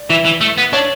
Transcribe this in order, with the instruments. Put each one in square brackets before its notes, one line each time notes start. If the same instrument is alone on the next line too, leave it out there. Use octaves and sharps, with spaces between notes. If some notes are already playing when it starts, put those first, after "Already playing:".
Already playing: [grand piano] D5
[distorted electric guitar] E3 [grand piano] E4 E5
[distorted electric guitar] E3
A3
B3
[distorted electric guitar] D4 [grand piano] C#5